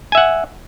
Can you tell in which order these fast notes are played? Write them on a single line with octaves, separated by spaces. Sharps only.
G#5 E5 F#5